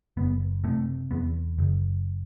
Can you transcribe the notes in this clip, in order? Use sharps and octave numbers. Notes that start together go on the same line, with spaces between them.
F#1 B3
C3 A3
E2 B3
F#1